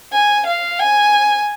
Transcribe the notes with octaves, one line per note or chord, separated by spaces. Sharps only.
G#5
F5
G#5